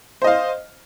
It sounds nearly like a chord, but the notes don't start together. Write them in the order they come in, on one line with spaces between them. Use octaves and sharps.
C5 D#5 F5